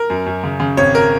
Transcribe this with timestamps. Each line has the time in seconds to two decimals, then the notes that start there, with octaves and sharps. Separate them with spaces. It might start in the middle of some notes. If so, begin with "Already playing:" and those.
Already playing: A#4
0.10 F#2
0.26 F#2
0.44 C#3
0.60 C#3
0.77 G#1 C#5
0.95 A#4